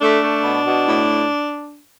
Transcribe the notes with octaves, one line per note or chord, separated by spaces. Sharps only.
A3 D4
A3
B2
B2
A2